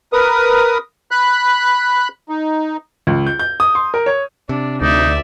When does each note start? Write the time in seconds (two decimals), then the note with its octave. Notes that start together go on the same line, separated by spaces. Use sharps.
0.13 A#4 B4 D#6
1.11 B5 F#6
2.29 D#4
3.07 C#2
3.26 G6
3.39 G6
3.60 D#6
3.75 C6
3.94 A#4
4.06 C#5
4.49 C3 D4
4.81 D2 D#4 D5 E5